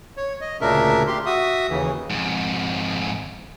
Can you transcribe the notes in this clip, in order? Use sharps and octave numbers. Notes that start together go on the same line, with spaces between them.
C#5
D#5
D2 A#2 C#3 D4 A#4 E5
G4 C6
F#4 E5 D#6
D#2 C#3 E3
F2 G#2